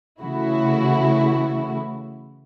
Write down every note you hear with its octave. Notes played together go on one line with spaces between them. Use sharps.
C#3 E3 A3 E4 F#4